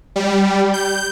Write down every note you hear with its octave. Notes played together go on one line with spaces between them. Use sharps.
G3
G6